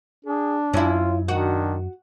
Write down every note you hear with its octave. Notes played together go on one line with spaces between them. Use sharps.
D4 G#4
F#2 C#4 E4 F4
D#3 D4 F#4